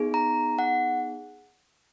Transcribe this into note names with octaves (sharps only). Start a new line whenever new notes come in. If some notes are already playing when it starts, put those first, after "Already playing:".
Already playing: B3 D#4 G#4
A#5
F#5